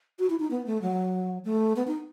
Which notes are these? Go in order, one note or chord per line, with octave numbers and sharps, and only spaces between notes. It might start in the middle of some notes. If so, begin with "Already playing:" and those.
F#4
E4
D#4
B3
A3
F#3
A3
B3
D#4